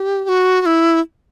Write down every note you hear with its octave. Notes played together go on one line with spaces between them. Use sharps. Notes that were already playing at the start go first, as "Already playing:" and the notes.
Already playing: G4
G4
F#4
F#4
E4